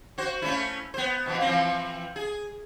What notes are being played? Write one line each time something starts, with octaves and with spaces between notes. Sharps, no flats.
F#4 C5
A3 C#4 E4
B3 C5
B2 E3 F3
E3 F3 C4
G#4